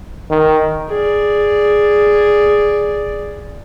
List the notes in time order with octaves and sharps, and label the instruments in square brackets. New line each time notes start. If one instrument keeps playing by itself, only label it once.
[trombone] D#3
[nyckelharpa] G#4 D5